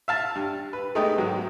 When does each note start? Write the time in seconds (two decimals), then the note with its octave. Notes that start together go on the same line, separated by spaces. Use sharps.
0.08 E5 F5 A5
0.35 G2
0.73 B4
0.95 G#3 A3 B3 D#4 G4
1.18 G#2 D#3 F#3